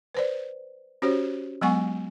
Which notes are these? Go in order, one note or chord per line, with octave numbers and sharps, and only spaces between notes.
B4 C5 D5
C#4 F#4 G4 C5 C#5
F#3 G#3 B3 F#5 G#5 C#6